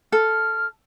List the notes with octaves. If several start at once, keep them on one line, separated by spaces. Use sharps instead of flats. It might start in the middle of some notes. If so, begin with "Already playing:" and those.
A4 F6